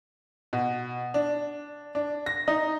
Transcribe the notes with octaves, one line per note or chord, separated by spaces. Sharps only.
B2
D4
D4
A#6
D#4